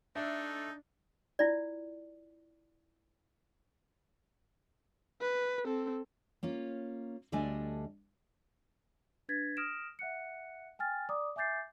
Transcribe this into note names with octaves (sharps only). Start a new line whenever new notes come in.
A3 D4 D#4 A4 E5
E4 F4 D5
B4
C4 A4
A#3 C#4 F4
D2 G3 A3 D4 D#5 G#5
D4 B4 G#6 A6 B6
D#6 F6 A#6 D7 E7
E5 F#5 F#6 C#7
G5 G#5 F6 A6
D5 A#5 D6 D#6
E5 G#5 D6 G6 A6 C7